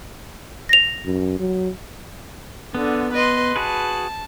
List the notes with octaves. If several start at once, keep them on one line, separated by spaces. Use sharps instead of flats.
A#6 F7
F#2
F#3
D3 B3
B4 D#5 C6
F#4 G#4 B4 A5